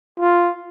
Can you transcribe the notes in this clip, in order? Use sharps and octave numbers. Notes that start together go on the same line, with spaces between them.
F4